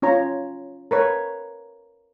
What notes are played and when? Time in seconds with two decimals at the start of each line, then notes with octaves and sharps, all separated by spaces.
0.02 C#4 F4 C#5 A#5
0.91 A#4 B4 C#5